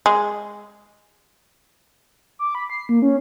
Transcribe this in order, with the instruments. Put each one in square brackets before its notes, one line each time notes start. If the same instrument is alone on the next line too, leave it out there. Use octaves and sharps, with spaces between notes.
[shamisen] G#3
[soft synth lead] D6
B5
C7
A#3
C#4